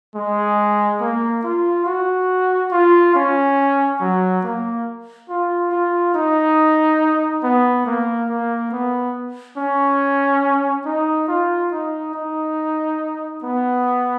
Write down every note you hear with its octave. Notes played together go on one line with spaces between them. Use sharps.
G#3
A#3
F4
F#4
F4
C#4
F#3
A#3
F4
F4
D#4
B3
A#3
A#3
B3
C#4
D#4
F4
D#4
D#4
B3